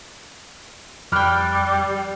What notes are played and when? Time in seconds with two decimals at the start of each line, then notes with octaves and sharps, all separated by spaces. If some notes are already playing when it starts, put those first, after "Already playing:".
1.12 F2 G3 G4 G5 B5 D6 F6 F#6